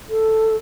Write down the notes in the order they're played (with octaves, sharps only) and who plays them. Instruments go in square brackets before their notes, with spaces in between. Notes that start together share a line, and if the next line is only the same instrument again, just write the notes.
[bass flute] A4